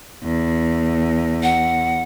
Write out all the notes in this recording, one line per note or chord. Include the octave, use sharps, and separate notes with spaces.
E2
F#5